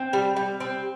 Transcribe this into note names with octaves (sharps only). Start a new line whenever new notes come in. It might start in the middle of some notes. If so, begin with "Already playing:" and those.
Already playing: C4
G3
G3
C4